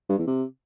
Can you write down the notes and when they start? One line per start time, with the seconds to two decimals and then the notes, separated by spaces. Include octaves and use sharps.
0.09 G2
0.18 E2
0.27 C3